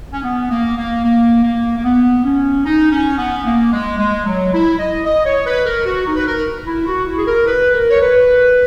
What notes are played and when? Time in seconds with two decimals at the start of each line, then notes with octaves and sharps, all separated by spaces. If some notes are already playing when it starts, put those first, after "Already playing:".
0.13 C#4
0.24 B3
0.51 A#3
0.77 A#3
1.05 A#3
1.44 A#3
1.78 A#3
1.84 B3
2.25 C#4
2.65 D#4
2.91 C#4
3.18 B3
3.45 A#3
3.73 G#3
3.99 G#3
4.26 F#3
4.53 E4
4.79 D#5
5.06 D#5
5.26 C#5
5.46 B4
5.66 A#4
5.86 F#4
6.06 D#4
6.17 B4
6.27 A#4
6.67 E4
6.86 F#4
7.07 E4
7.18 G#4
7.27 A#4
7.47 B4
7.73 A#4
7.91 C#5
8.01 B4